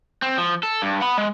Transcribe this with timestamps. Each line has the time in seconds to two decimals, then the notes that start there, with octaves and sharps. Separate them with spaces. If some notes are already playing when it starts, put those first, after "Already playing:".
0.22 C4
0.38 F3
0.63 A4
0.82 G2
1.02 F#5 B5
1.18 G#3